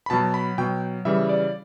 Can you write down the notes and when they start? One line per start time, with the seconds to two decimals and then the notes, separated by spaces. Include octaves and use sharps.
0.06 B5
0.10 B2 F#3 A5
0.34 B5
0.58 B2 F#3 G5
1.05 C#3 E3 G3 E5
1.29 D5